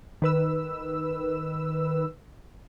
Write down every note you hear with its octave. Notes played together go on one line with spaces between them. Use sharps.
D#3 B4 E6